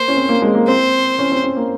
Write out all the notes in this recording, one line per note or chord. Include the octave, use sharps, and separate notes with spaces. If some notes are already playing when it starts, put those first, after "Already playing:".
Already playing: A#3 C5
C#4
C4
A#3
G#3
A#3
C4 C5
C#4
C4
C4
A#3